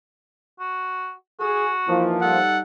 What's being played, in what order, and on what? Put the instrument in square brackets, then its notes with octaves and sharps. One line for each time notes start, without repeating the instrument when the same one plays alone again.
[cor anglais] F#4
[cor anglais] F#4 [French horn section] G#4
[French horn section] E3 D#4 E4 [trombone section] F3 A#3
[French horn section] G3 D#4 [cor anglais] A4 [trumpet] F#5